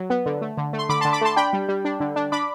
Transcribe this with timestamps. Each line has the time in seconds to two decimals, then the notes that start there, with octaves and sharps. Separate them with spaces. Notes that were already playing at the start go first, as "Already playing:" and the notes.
Already playing: F#3
0.10 B3
0.26 D3
0.42 A3
0.57 D3
0.73 A3
0.78 C6
0.89 D3 B5 D6
1.01 D3 A5 C6
1.13 B5 D6
1.21 A3 A5 C6
1.37 D4 G5 B5
1.53 G3
1.69 G3
1.85 D4
2.00 D3
2.16 D4
2.32 D4 B5 D6